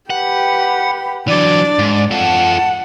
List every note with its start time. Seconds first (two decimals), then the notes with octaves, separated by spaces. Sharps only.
0.10 G4 B4 F#5
1.28 E3 F#3 D4 D5
1.79 G#2
2.11 F4 A4 F#5 A5